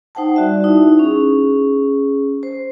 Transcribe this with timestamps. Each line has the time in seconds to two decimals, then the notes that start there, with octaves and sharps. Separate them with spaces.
0.15 D#4 C5 F#5 G5 A5
0.36 G3 F#4 D5 E5
0.64 D#4 E4
0.99 C#4 G#4
2.43 C5